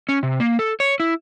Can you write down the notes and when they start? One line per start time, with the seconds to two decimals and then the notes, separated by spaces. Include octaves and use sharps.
0.09 C#4
0.23 C3
0.40 A#3
0.59 A4
0.80 C#5
1.00 E4